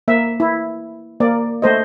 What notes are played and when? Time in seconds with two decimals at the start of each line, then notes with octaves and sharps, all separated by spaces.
0.08 A#3 E5
0.40 E4
1.20 A#3 D5
1.62 A3 C5 D#5